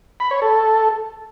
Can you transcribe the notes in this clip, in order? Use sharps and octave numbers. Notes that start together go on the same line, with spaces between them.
B5
C#5
A4